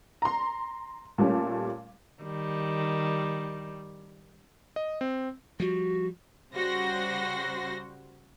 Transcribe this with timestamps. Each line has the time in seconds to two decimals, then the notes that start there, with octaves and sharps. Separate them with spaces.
0.22 A#5 C6
1.18 A#2 G3 A3 C#4
2.22 D#3 G3
4.76 D#5
5.01 C4
5.60 F3 G3 F#4
6.54 C#3 G3 F#4 C5 A#6